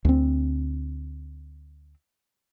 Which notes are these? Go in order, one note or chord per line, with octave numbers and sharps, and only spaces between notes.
D2 C4